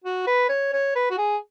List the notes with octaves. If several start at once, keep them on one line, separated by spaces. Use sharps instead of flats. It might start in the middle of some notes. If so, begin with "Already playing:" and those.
F#4
B4
C#5
C#5
B4
F#4
G#4